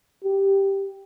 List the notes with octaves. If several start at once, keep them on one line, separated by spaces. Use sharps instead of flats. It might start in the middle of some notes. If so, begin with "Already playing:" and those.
G4